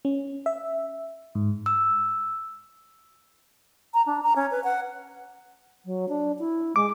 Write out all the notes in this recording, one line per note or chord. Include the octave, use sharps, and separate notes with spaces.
C#4
E5
G#2
E6
A#5
D4
A#5
C#4
B4
F#5
F#3
D4
E4
G#3 D6